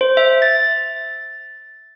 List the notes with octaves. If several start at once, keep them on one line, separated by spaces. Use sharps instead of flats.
C5
E5
A6